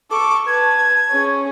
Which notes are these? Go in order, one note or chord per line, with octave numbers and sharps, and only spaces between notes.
A4 C#6 D6
B4 A5 G#6
C#4 G#4